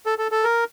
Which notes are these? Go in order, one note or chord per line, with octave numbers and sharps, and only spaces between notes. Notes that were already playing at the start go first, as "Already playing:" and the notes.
A4
A4
A4
A#4